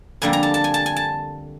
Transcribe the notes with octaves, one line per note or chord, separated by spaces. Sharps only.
F2 D3 G3 A#3 G#5
A#5
A5
A5
G#5
A5
G#5
A5